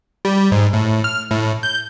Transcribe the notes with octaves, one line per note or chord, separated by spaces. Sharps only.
G3
G#2
A2
F6
A2
G6